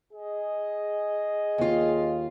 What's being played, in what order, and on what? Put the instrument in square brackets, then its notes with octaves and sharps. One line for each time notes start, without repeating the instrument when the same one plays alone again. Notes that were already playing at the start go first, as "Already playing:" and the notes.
[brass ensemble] G#4 D#5
[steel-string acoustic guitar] D#2 F4